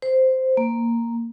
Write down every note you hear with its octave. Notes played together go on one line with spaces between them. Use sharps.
C5
A#3